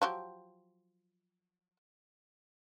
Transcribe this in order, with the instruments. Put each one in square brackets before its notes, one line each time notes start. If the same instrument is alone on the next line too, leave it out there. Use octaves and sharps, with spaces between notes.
[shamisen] F3 F#3 G4